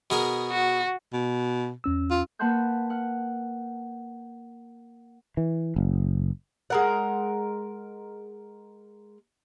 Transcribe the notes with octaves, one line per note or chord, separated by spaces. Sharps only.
B2 G#4 A#4
F#4
B2
E2 C#4 E6
F4
A#3 B4 F#5 A5 C6 G6
F#5 F6
E3
F#1
G#3 A#4 F#5